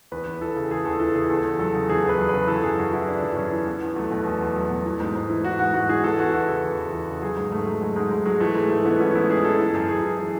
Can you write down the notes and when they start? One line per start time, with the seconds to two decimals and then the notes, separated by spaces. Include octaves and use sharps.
0.12 E2 B4
0.27 E2
0.41 E3 A4
0.56 C#3
0.71 E2 G#4
0.85 E2 A4
1.00 E3 A4
1.15 C#3 G#4
1.30 E2 A4
1.44 E2
1.59 F#3 A4
1.75 C#3
1.89 E2 G#4
2.03 E2
2.09 B4
2.18 F#3
2.29 C#3 B4
2.48 E3 A4
2.63 F#2 G#4
2.78 F#2 F#4
2.93 E3 E4
3.07 E3 D4
3.22 F#2
3.37 F#2 C#4
3.52 E3
3.67 E2 B3
3.82 E2
3.96 F#3 A3
4.11 B2
4.26 E2
4.41 E2
4.56 F#3
4.70 B2
4.86 E3
5.00 G#2
5.15 G#2
5.30 E3
5.44 E3 F#4
5.59 G#2 F#4
5.74 G#2 F#4
5.89 E3 G#4
6.04 E2 A4
6.18 E2 F#4
6.33 E3 E4
6.48 C#3 A4
6.63 E2
6.78 E2
6.93 E3
7.08 C#3
7.22 F#3 G#4
7.37 G#2
7.52 G#2 A3
7.66 F#3
7.82 F#3 G#3
7.96 G#2 G#3
8.11 G#2 G#3
8.25 F#3 G#3
8.40 E3 A3
8.55 G#2 G#3
8.70 G#2 A3
8.85 E3 B3
9.00 E3 C#4
9.15 G#2 E4
9.30 G#2 G#4
9.44 E3 A4
9.59 E3 A4
9.74 F#2
9.89 F#2 G#4
10.04 E3
10.18 E3 G#4